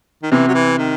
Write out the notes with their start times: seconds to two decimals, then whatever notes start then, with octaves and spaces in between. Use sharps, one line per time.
0.23 D#3
0.31 C3 E3
0.48 F#3
0.54 E3
0.78 D#3